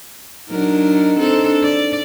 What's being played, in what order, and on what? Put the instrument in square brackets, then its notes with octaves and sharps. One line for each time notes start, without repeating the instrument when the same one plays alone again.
[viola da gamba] F#3 D4 A#4 [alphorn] D#4
[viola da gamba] C4 D4 A4
D5